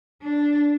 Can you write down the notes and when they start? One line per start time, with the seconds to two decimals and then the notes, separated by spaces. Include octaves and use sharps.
0.22 D4